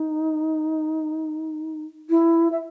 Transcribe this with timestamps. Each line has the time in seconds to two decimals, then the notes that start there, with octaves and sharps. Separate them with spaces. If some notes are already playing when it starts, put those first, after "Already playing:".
Already playing: D#4
2.10 E4
2.52 E5